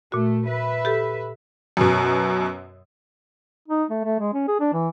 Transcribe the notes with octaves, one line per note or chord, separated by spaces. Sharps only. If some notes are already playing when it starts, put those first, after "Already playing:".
A#2 A3 F#4
B4 E5
G4 A4
F#2 B2
D#4
A3
A3
G#3
C#4
G#4
D4
E3